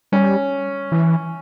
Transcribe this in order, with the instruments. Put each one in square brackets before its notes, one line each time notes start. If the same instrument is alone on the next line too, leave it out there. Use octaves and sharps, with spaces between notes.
[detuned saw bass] G3 [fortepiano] C#4
[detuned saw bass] E3